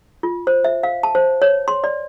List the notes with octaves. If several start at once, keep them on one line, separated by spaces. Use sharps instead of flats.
F4
C5
E5
F5
A5
C5
C#5
C6
D5